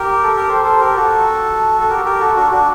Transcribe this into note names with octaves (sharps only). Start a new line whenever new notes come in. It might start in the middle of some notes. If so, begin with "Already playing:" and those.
Already playing: G4 A#4
A4
A#4
A4 C5
A4 C5
G4 A#4
F#4 A4
A4
G4 A#4
G4 A#4
F#4 A4
D4 F#4
D4 F#4